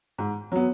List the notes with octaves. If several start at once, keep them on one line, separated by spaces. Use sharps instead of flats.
G#2
F#3 B3